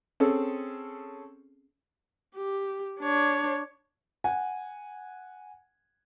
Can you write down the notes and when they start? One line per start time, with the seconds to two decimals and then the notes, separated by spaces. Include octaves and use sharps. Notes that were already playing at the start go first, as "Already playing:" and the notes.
0.20 C4 C#4 G#4 A4
2.35 G4
3.00 D4 C#5
4.24 F#5 G#5